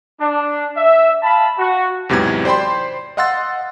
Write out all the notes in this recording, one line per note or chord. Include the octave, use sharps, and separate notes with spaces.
D4
E5
F5 A5 B5
F#4
E2 G#2 C3 E3 F#3 G#6
C5 D5 G5 B5 C6
D#5 F5 F#5 C6 E6 A6